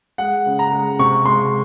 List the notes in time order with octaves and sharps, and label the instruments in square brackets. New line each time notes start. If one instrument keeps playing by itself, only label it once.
[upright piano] G#3 F#5
C#3
A#5
G#3
C3 C#6
G#3 C6